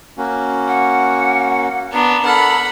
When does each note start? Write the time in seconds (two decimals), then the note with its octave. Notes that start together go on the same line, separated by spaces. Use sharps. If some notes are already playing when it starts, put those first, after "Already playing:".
0.18 A#3 C#4 F#4
0.68 F#5
1.93 B3 D4 A#5
2.25 A4 A#4 F#5 B5